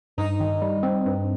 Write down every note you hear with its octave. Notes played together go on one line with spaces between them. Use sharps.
G2 D#4
D#3
G3
C4
G2